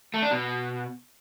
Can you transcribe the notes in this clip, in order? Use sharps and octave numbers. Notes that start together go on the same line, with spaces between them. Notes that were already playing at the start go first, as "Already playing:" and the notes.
A3
D4
B2